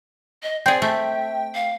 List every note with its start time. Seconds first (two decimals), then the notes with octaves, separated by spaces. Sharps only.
0.43 D#5
0.66 C4 G#4 D5 G5
0.82 A3 E5
1.55 F5